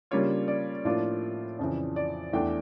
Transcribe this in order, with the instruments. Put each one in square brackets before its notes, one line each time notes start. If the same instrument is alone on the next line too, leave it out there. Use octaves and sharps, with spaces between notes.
[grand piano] C#3 G3 A#3 D4 F4 C#5
D5
A2 F3 A#3 D4 F4
F2 C#3 E3
D5
E2 E3 A3 D4 G5